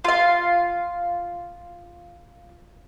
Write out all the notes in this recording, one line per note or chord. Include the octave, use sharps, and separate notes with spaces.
F4 F5